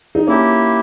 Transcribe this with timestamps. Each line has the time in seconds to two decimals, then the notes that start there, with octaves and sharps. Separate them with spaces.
0.15 D#4
0.27 A#3 C#4 E4 G4